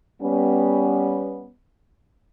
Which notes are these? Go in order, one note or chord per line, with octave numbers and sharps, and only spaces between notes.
G3 B3 C#4